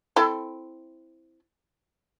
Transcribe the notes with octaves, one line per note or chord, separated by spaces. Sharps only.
C4 E4 A4